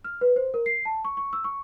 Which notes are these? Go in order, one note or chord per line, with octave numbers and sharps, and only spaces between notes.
F6
B4
C5
A#4
C7
A5
C#6
C#6
E6
C#6